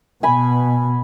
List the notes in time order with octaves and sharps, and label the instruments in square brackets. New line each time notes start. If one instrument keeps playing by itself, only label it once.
[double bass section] B2 [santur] G#5 B5